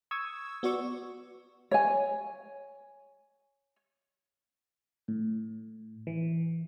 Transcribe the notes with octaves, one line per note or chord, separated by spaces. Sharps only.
C#6 D#6 E6 G#6
B3 F#4 D5 C#6 E6
C#5 G#5
A2
E3